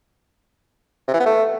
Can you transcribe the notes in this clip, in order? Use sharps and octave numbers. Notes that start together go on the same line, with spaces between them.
C3
E3
B3
A3